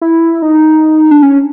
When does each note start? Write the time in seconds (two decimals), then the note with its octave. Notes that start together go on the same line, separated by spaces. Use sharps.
0.02 E4
0.42 D#4
1.11 D4
1.22 C#4